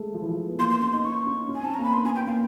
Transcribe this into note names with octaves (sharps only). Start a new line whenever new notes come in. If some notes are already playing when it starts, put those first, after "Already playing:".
Already playing: G#3 A3
F3
E3
F3
B3
A#3 C6
B3 C6
C#4 C6
D#4 C6
D#4 C#6
C#4
C#4
G#5
C4 A5
A#5
A#3
B5
B3 C6
C#4 G#5
B3 G5
A#3 F5